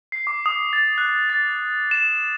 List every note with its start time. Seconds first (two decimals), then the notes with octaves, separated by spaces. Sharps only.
0.12 C7
0.27 D6
0.46 D#6
0.73 A6
0.98 F#6
1.30 A6
1.91 E7